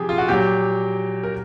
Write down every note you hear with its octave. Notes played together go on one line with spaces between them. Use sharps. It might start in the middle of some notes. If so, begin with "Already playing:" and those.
Already playing: C3 F3 G4 G#4
F4
F#4
A#2 F#3 G4
A#4